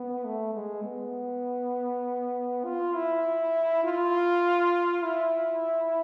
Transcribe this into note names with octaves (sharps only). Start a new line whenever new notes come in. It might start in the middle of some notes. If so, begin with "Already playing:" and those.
Already playing: B3
A3
G#3
B3
F4
E4
F4
E4